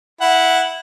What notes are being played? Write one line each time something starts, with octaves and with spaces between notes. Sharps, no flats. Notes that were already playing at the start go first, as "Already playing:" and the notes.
E4 F#5